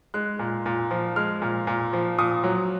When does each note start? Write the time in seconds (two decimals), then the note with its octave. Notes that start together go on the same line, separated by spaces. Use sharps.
0.14 G#3 F#6
0.39 A#2
0.66 A#2
0.91 F3
1.16 G#3 F6
1.42 A#2
1.67 A#2
1.93 F3
2.18 A#2 D#6
2.44 F#3